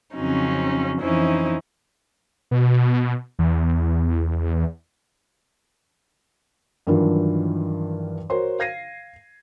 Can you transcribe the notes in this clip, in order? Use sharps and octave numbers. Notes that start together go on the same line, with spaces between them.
F2 C#3 F#3 C4 C#4 D#4
F2 E3 C#4 D#4 E4 C5
B2
E2
G2 D#3 E3 F#3 D4 F4
F#4 A#4 C5 C#5 C6
F5 G#6 A#6 C7 D#7